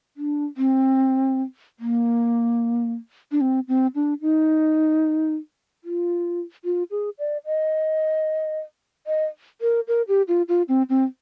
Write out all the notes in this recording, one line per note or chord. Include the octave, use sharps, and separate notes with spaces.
D4
C4
A#3
D4
C4
C4
D4
D#4
F4
F4
G#4
D5
D#5
D#5
A#4
A#4
G4
F4
F4
C4
C4